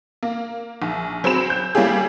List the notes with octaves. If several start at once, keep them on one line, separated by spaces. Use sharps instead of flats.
A#3
A#1
F#3 C4 G#4 B5 E7
G6
G3 A#3 C#4 E4 G4 G#4